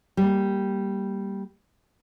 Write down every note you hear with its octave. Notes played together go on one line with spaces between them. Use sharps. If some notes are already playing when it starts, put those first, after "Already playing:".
G3 A#3